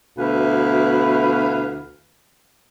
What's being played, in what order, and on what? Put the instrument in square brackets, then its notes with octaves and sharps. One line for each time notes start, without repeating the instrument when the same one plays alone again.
[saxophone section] D2 B2 E4 B4 F5